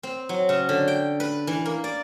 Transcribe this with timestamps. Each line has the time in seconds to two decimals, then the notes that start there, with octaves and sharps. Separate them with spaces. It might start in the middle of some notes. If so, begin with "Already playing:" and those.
0.03 C4
0.29 F#3
0.49 C#3
0.69 D3
0.88 G5
1.20 B4
1.47 E3
1.66 A#3
1.84 D5